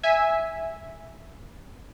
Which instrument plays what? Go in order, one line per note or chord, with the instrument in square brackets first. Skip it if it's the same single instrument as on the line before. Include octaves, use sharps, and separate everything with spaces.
[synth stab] E5 G#5